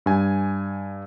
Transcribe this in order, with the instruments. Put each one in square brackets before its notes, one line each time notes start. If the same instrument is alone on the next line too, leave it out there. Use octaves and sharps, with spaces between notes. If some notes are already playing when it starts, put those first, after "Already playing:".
[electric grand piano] G2 G#5